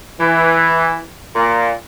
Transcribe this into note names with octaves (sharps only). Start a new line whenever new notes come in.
E3
A#2